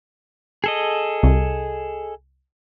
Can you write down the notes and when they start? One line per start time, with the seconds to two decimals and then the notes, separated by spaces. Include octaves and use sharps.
0.64 G#4 A4 D#5
1.23 C2